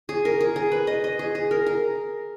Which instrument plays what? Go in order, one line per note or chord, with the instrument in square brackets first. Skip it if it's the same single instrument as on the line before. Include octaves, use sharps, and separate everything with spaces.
[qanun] G#4
A#4
G#4
G#4
B4
D#5
D#5
G#4
G#4
A#4
A#4